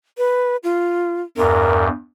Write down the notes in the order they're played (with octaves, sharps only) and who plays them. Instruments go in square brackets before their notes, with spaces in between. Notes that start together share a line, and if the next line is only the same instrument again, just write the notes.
[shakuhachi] B4
F4
[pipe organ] E2 G2 [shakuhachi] A#4